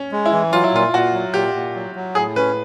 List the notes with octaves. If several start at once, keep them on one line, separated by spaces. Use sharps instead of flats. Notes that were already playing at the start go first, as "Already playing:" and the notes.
Already playing: C#4
G#3
E4
E3
F#3 F4
E4
A#2 F4
A#2 F#4
F#3
A#2 G4
A#2
F#3
F#3
A2 G#4
C#4 B4